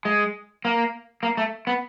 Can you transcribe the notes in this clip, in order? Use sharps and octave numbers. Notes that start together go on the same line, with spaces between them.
G#3
A#3
A#3
A3
B3